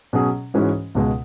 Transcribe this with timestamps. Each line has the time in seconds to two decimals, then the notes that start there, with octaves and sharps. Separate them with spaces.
0.13 B2 F#3 C#4 G#4
0.54 G#2 E3 G#3 C#4 F#4
0.95 C#2 B2 G#3